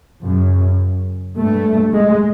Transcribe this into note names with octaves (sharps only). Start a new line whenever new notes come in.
F#2 C#3
G2 A3
G#3